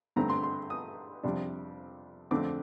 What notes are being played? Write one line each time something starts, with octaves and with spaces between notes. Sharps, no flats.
G2 D3 A3 C4 A#5
C6
C6
D#6
F2 C3 G3 D4
F2 D3 A3 C4 D6